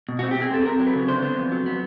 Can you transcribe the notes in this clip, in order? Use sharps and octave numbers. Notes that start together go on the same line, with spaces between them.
B2
C4 F#4
G4
C4
G#4
C4 A4
C4 A#4
F#3
B4
C#3
D3 C5
B3
F2
F#3
B3